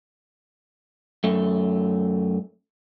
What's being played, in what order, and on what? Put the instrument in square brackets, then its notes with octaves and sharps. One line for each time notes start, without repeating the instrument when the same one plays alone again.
[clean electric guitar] F#2 A3